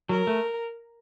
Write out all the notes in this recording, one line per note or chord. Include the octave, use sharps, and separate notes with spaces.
F#3 A#4
A3